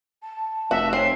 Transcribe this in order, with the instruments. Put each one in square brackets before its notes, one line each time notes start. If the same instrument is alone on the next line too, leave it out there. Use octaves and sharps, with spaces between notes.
[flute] A5
[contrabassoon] F1 [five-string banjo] F#4 [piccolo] E5
[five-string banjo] C4 [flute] C#5 [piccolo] C7